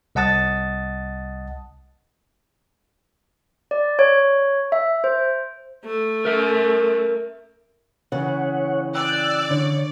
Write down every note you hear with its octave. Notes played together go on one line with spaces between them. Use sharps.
C2 D#5 F#5 A5 D#6 A6
D5
C#5
E5
C5
A3
A#4 E5
C#3 E3 C#5 F#5
D5 G5 E6 F#6
D3 C#5